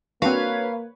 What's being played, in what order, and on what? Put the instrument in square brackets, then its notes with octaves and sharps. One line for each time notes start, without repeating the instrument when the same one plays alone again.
[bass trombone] A#3 [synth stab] C4 D4 F#4 [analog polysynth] B4 C#5 [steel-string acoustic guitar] F5